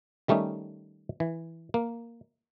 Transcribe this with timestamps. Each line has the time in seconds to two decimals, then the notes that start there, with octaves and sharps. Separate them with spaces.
0.28 D#3 G3 A3 C#4 D#4
1.20 E3
1.74 A#3